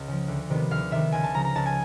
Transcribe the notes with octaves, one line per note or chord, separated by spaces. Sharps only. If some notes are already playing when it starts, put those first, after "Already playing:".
Already playing: C#2
C#3 F3
D2
C3 D#3 G3 B3
D2 F5
C3 D#3 G3 B3 E5
C#2 G#5
A5
C#3 F3 A#5
A#5
C#2 A5
G#5